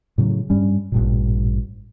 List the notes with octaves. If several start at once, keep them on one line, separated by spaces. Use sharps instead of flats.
A2 C#3 E3 F#3
G2 G3 C#4
A1 G2 A#2